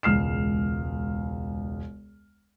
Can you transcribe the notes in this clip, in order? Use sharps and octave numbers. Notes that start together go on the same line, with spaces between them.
E1 C#2 F6 C7 E7